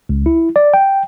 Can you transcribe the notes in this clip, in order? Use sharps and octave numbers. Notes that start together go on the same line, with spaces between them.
C#2
E4
D5
G5